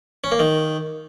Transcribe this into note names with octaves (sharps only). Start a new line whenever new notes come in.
C#4
A#3
D#3